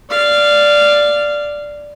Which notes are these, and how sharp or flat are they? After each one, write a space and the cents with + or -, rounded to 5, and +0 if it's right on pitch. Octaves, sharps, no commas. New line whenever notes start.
D5 +0 F5 -15